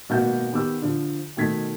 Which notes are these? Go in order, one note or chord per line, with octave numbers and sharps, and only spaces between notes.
G#1 B2 A#3 F#4 E5 G6
D#3 B3 G4 D6 E6
D3 F3
B2 D#3 A3 G#6 B6